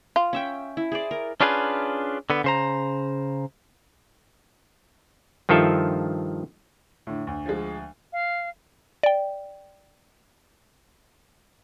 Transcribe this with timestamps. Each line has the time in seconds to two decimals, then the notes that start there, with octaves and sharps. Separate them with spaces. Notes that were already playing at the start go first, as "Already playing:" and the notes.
0.16 F4
0.33 C#4 E5 G5
0.77 E4
0.92 G#4 C5 D5
1.11 A#4
1.41 C#4 D4 F4 G#4 B4
2.30 D3 B3
2.44 C#3 C5 A#5
5.49 G2 D#3 F3 F4 A4 E5
7.07 A2 D3
7.27 D2
7.46 F3 G#3
8.13 F5
9.03 D5 G5